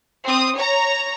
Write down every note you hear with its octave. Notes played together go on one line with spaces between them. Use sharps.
C4 D#6
C#5 A#5